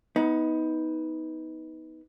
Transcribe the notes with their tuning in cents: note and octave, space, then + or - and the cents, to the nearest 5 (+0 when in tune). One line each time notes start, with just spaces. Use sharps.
B3 +0 D#4 +25